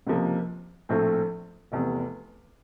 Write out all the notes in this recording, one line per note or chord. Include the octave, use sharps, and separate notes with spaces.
C#2 C3 F3 A#3
A#1 A2 F3 A3 C4
F1 E2 C3